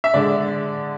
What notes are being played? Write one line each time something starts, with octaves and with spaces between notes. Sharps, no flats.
E5
D3 G#3 D4 D5